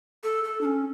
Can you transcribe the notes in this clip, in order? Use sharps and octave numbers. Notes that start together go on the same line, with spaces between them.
A4
A4
D4
C#4